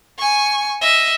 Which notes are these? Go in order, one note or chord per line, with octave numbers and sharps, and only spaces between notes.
G#5 C#6
D#5 E5